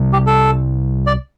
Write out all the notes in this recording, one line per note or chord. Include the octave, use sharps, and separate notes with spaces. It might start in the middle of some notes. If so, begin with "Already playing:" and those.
Already playing: C2 C3 G3
G4
A4
D5